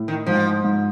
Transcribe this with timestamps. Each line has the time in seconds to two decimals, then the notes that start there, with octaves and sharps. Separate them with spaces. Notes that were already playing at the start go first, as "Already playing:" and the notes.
Already playing: A2
0.08 D#3
0.26 G#2 F3
0.64 G#2